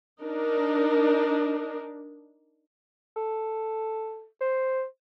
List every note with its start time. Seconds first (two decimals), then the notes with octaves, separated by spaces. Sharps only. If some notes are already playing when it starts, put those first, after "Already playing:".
0.21 D4 D#4 A#4
3.16 A4
4.41 C5